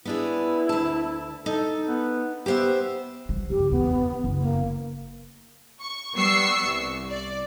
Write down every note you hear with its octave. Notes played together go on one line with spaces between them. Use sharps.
B3 D4 E4 G#4
D2 A5
D#4 A4
B3
B3 G4 C5 E5
G3
F#1 G2 G4
E2 B3
D3
F#1
A#3
C#6
G3 B3 C#6 E6 C7 C#7
C2
D5